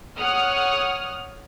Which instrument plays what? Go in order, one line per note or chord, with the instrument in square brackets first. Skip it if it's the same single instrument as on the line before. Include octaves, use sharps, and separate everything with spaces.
[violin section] C#5 F#5 D#6 F6